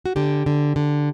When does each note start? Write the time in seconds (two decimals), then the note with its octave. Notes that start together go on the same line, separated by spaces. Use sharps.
0.06 F#4
0.16 D3 G4
0.46 D3
0.76 D3